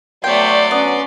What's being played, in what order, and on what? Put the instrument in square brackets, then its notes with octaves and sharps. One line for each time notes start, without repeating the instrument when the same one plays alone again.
[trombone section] F#3 D4 [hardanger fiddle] A3 B3 [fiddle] D5 C6 [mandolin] G5
[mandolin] B3 [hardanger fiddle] C#4